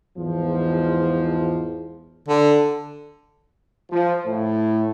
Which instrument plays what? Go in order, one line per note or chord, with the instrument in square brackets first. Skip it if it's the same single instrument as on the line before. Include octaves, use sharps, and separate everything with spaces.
[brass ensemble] E2 G#2 F3
[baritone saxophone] D3
[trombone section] F3
A2